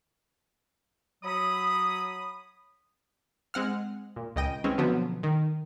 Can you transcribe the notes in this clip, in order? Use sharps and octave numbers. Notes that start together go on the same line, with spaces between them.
F#3 B5 D#6
G#3 C4 F#5 F6
A#2
C#2 D#5 G5 D#7
E3 G#3 C4 C#4
B2 D3 F3 F#3 B3
D#3